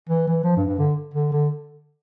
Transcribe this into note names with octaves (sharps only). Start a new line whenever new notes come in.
E3
E3
F3
G2
G2
D3
D3
D3